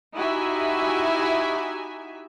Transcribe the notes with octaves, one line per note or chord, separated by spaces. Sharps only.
D#4 E4 F#4 G4 E5 G#5